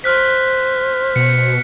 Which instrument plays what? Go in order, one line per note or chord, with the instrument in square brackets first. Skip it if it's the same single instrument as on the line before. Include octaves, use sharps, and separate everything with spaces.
[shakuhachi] C5 [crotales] F6 F#6 B6
[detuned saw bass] B2 [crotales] C#7